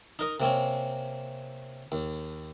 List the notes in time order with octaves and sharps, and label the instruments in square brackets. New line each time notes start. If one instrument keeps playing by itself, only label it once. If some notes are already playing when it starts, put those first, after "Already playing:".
[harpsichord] D#4 A#4 D#5
C3 A#3 C4 C#4
D#2